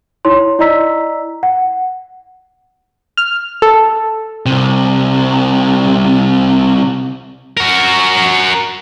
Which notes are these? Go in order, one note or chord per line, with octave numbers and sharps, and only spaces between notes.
D#4 E4 C#5 C6
E4 D5 D#5 A#5 E6 B6
F#5
F6
A4
C2 C3
F#4 A#4